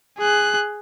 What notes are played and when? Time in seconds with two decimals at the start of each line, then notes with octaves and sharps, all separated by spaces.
0.18 G#4 F#6